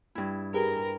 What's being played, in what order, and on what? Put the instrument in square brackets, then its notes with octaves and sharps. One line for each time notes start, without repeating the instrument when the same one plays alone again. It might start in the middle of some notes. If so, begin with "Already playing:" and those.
[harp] G2 E4
[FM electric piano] G4 G#4 B4 [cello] A#4